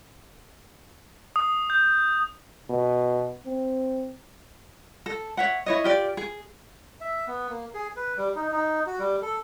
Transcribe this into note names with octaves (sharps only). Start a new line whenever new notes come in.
D#6
G6
B2
C4
A4
C#5 E5 F#5
E4 C#5 D#5
F4 G4 D5
G#4
E5
B3
A#3
G#4
B4
G3
D#4
D#4
F#4
G3
A4